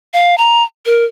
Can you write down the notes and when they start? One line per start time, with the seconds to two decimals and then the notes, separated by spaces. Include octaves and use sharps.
0.14 F5
0.38 A#5
0.86 A#4